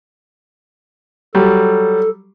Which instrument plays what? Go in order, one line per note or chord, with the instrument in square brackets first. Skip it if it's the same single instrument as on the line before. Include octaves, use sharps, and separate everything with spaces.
[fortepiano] F#3 G3 [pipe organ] A4